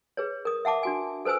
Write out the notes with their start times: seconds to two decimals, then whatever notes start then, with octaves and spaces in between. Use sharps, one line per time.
0.17 G#4 B4 C#5
0.45 A#4 D#6
0.65 E5 F#5 A5 D6
0.83 D4 F#4 G#5
1.25 A4 B4 C5 G#5 E6